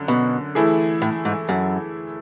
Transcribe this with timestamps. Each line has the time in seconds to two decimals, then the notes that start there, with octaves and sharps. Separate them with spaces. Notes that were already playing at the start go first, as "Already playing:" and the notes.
Already playing: F#2 D3
0.08 B2
0.55 E3 A3 E4 G#4
1.02 A2
1.25 G#2
1.49 F#2